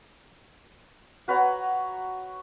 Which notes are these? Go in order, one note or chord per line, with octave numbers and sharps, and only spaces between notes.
F#4 B4 C#5 A#5